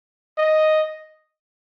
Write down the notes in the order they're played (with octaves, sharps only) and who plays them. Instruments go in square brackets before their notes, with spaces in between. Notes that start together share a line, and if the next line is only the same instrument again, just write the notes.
[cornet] D#5